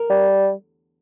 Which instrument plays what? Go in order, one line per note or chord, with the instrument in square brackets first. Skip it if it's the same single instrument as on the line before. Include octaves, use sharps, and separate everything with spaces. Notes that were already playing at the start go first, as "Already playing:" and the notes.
Already playing: [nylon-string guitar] A#4
[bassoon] G3